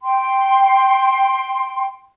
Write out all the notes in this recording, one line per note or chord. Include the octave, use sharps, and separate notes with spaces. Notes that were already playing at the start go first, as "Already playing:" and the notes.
G5 C6